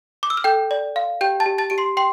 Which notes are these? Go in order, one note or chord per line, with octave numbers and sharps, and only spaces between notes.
D6
E6
F6
A4 G5 G6
D5
F5
G4 G5 G6
A5 A6
G4
A5 A6
G4 D7
C6 C7
G5 C6 C7